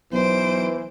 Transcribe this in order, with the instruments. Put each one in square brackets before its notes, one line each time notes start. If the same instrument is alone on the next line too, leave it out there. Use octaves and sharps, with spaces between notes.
[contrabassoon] B1 [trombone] E3 [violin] C5 D7